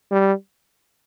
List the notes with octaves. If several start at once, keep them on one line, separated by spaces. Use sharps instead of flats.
G3